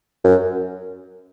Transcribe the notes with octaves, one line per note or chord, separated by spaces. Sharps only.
F#2